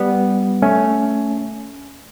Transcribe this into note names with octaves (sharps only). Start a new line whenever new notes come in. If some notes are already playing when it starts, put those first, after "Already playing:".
Already playing: G3 B3
A3 C#4